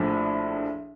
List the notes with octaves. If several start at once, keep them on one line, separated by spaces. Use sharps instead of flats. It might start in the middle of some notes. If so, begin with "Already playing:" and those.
Already playing: A#1 A2 F3 D4